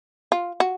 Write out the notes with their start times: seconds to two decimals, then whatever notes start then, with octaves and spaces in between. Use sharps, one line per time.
0.32 F4
0.60 F#4